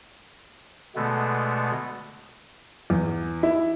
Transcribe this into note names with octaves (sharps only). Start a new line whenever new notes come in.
B2 D3 G#3 A3 B3
E2
E4